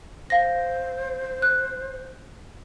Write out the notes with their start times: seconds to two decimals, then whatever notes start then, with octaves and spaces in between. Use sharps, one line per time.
0.30 C5 F5 A#6
1.42 F#6